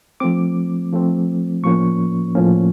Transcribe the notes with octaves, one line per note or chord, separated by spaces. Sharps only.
F3 A3 C4 D6
F3 A3 C4
A2 F3 A#3 C#4 C#6
A2 F3 A#3 C#4